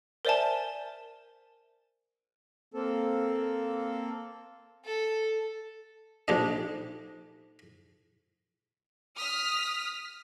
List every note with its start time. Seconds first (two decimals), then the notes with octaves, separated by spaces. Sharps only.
0.25 A#4 C5 D5 E5 G#5 A5
2.74 A#3 C4 A4
4.85 A4
6.28 A#1 D#4 G4 A4 C5 D#5
9.16 D#6 F6 B6